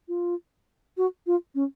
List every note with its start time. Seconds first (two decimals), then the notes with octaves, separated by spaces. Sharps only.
0.08 F4
0.97 F#4
1.27 F4
1.55 C#4